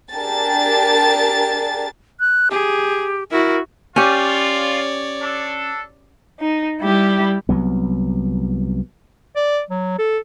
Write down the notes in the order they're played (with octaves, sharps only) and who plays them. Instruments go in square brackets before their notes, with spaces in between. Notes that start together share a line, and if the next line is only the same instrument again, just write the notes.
[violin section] D4 G4 G#4 A#4 A5 A6
[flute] F#6
[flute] G4 [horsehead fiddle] G#4
[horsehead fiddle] E4 F#4 [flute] A#4
[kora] C#4 G4 [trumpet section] F4 [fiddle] C#5 D5
[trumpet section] D4 A4
[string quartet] D#4
G3 E4 G4
[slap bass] C2 F#3 B3
[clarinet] D5
F#3
A4